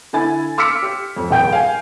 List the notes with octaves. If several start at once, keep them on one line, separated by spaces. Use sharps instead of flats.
D3 E4 G#5 A6
C6 D6 E6 F6 B6 C#7
G4
F2
D#1 G#4 G5 G6 D7
F5 G#5